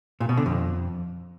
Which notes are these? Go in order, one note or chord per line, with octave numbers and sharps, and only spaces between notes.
A#2
B2
D3
F2